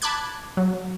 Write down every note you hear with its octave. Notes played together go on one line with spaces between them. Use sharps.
A5 B5 D6 F#6 G#6
F#3